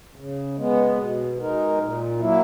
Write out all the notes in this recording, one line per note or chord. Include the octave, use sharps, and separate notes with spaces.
C#3
G#3 B3
B2
G#3 D#4 A#4
A#2
F#3 A#3 E4